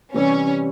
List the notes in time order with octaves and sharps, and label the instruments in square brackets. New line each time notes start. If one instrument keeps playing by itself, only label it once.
[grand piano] C3 E3 G3 [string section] C#4